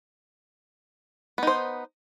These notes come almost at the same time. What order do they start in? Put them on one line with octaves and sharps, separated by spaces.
B3 D#4 C5